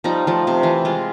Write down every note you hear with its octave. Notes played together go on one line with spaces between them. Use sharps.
F3 G3 D#4
F3 A3
C3
E3
G#3 F4